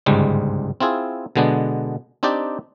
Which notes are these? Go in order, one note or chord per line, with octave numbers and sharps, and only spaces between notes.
G1 C#2 G#2 G3 G#3
C4 E4 F4 G#4
B2 D3 G#3 B3 D4
C4 D4 D#4 G4 D5 G5